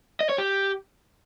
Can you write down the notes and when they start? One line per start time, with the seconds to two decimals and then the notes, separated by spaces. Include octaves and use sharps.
0.21 D#5
0.29 C#5
0.38 G4